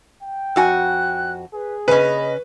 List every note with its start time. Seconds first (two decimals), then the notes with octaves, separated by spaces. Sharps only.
0.23 G5
0.56 F2 F#4 G#5 F#6
1.53 G#4 B4
1.88 C#3 C#4 B4 D#5